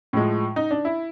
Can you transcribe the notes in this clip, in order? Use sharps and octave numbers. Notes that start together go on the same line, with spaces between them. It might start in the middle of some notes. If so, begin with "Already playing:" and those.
A2 F3 G#3
D#4
D4
E4